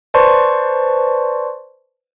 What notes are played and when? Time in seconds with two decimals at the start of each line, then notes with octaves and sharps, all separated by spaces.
0.14 B4 C5 D5 A5 C6 C#6